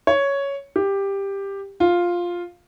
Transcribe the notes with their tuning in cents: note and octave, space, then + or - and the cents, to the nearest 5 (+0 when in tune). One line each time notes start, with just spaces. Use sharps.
C#5 +5
G4 +10
F4 +5